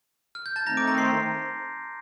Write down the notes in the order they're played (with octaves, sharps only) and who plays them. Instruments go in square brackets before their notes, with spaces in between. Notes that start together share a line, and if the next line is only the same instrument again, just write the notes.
[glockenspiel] F6
G6
A5 A6
[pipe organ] D#3 A3 C4 D#4 [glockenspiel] A#5 A#6
[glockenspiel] D6 D7
A#5 A#6
C6 C7